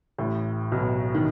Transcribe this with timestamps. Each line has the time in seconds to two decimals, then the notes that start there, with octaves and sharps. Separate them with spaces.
0.18 A1 A2
0.72 B1 B2
1.14 D#3